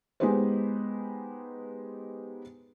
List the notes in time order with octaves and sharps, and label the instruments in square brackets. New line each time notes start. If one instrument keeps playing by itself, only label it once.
[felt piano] G#3 B3 D#4 G4 B4 C5